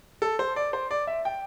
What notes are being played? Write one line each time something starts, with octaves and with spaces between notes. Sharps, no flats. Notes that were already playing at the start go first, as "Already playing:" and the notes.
A4
C5
D5
C5
D5
E5
G5